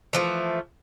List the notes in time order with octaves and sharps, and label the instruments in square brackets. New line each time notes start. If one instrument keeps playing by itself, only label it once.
[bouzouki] E3 F3 A3